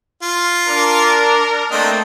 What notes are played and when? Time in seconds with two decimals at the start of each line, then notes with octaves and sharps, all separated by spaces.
0.22 F4
0.68 D4 A#4
1.71 A3 A#3 C4 D4 D#5